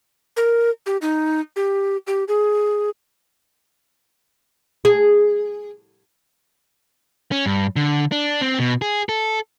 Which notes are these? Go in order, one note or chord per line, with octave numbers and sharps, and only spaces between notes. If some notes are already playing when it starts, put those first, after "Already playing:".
A#4
G4
D#4
G4
G4
G#4
G#4
C#4
G2
D3
D4
C4
B2
G#4
A4